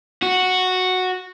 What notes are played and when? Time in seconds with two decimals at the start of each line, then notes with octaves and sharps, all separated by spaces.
0.22 F#4